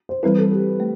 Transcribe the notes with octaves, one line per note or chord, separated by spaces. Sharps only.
C5
E3 G3 C4 E4 B4
A4
G4
A3